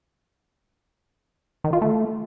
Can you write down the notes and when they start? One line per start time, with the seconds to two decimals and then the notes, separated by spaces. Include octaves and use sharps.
1.64 D#3
1.73 F4
1.82 A3